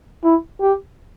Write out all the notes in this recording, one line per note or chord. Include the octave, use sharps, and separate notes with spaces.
E4
G4